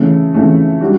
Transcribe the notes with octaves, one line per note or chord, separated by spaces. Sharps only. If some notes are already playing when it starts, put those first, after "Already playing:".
Already playing: C#3 E3 A3
C#3 E3 A3
G3 D4 F#4